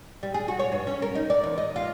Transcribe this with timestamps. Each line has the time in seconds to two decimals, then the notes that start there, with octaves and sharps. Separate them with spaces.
0.23 G3
0.34 G#4
0.48 F#4
0.59 C#5
0.72 G2
0.87 C#4
1.02 A#4
1.15 D#4
1.30 D5
1.43 E2
1.58 D#5
1.76 F4